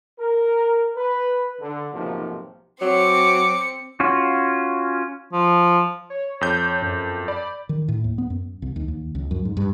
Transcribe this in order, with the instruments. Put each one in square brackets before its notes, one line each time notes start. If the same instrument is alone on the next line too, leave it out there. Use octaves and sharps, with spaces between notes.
[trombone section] A#4
B4
D3
B1 G#2 C3 F3 A#3
[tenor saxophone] F#3 [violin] C4 C#7 [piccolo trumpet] D6
[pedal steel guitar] C#4 F4 F#4
[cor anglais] F3
[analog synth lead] C#5
[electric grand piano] F2 G6
[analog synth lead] F#2
[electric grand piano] D5 [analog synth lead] B5
[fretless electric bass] D#3
A2
D#2
B3
F#2
C2
D#2
D#2
C#2
F#2
G#2
G2